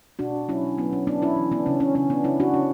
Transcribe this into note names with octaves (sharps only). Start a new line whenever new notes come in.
B2 D4 F#4
F#3 C#4 E4
F#3 B3
C#4
F#3 B3 D4
C#4 E4
E3
B3 D4
C#3 C#4
C#4
C#3 C#4
B3 D4
C#3 C#4 E4
D4 F#4
C#3 C#4